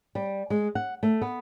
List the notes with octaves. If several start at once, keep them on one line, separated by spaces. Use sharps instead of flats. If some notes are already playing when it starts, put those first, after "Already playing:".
G3
G#3
F#5
A3
B3